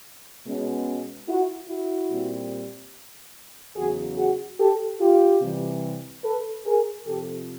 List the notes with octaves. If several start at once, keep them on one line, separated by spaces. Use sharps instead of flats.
B2 G#3 C#4
E4 F#4
E4 F#4
A#2 G3 C4
E2 C#3 F#3 F#4 G#4
F#4 G#4
G4 A4
F4 G4
C3 E3 G3
A4 B4
G#4 A#4
F2 C3 F3 G4 A4